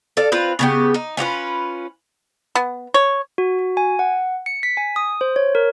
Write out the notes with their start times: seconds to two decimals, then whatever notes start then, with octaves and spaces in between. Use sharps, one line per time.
0.17 A4 D5 F5
0.32 C4 F4 B4
0.59 C#3 B3 G4
0.94 D#4
1.17 C#4 F4 F#4 B4
2.55 B3
2.94 C#5
3.38 F#4
3.59 F#4
3.77 G#5
3.99 F#5
4.46 C#7
4.63 B6
4.77 G#5
4.96 D#6
5.21 C5
5.36 C#5
5.55 A#4